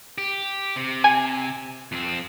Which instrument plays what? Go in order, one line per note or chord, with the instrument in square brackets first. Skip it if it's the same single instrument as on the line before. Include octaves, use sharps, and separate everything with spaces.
[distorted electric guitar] G4
C3
[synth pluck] G#5
[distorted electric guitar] F2 C4